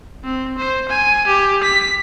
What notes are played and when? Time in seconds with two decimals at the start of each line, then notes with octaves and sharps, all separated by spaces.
0.24 C4
0.58 C5
0.89 G#5
1.27 G4
1.63 B6